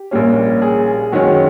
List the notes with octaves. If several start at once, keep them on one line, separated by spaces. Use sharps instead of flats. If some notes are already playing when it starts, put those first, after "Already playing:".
Already playing: G4
A#1 A#2 G3 A#3 C#4
G#4
F#2 D#3 G#3 C#4 F#4